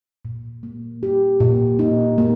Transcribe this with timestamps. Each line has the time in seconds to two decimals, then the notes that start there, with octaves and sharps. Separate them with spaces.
0.25 A#2
0.63 A#3
1.03 G4
1.40 A#2
1.79 D#4
2.18 A#3